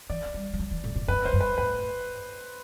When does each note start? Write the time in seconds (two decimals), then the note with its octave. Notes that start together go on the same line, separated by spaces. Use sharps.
0.10 E3 D5
0.34 G3
0.54 G3
0.59 F#3
0.71 E3
0.84 A2
0.96 A2
1.08 F#2 B4
1.25 G2 C5
1.33 F#2
1.41 B4
1.58 A2 B4